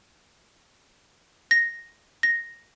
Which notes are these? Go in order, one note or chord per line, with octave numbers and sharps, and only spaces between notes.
A#6
A#6